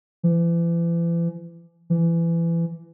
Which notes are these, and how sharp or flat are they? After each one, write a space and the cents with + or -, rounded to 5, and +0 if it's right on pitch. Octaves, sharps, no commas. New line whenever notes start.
E3 +40
E3 +25